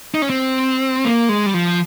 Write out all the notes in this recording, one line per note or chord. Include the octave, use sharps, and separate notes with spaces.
D#4
C#4
C4
A#3
G#3
G3
F3